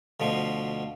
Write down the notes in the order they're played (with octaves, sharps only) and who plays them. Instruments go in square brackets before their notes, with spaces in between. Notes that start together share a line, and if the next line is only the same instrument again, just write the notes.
[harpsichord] D2 B2 F3